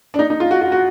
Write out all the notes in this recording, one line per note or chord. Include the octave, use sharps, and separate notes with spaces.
D4
D#4
D#4
F4
F#4
F#4
F#4